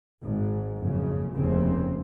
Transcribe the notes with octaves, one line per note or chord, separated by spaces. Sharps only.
G#1 G#2
F#1 F2 C#3
F1 D#2 C#3 C4